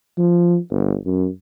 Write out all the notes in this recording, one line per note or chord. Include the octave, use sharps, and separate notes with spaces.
F3
G1
F#2